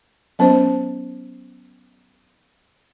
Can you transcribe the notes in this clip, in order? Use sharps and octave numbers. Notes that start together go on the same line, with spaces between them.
F#3 B3 C#4 C5